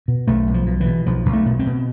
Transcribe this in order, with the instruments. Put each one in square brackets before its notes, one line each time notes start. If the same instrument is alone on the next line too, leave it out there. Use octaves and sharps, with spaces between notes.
[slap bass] B2
B1 A3
B1
F3
B2
E3
B2
B1 F3
B1
A3
B2
C4
B2